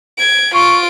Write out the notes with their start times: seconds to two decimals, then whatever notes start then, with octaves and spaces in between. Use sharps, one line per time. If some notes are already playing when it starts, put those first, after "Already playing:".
0.18 G#6 D7
0.54 F4 C#6 D7